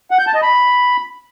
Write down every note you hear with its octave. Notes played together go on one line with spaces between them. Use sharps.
F#5
G6
A5
D#5
B5